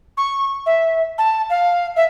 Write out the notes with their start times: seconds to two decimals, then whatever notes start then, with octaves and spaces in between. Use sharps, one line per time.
0.17 C#6
0.66 E5
1.18 A5
1.50 F5
1.96 E5